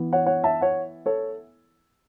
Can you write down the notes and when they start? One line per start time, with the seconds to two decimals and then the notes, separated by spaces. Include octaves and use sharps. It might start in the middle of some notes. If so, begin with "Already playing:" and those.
Already playing: E3 B3 E4
0.13 C#5 F#5
0.26 C#5 F#5
0.44 E5 A5
0.61 C#5 F#5
1.06 A4 C#5